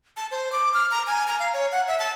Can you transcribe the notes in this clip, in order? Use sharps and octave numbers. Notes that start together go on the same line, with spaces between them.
A5
C5
D6
F6
A#5
G#5
A#5
F5
C#5
F#5
E5
A5